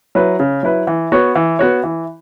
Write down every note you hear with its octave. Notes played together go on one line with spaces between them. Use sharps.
F#3 E4 B4
C#3
F#3 E4 B4
E3
B3 F#4 C#5
E3
B3 F#4 C#5
E3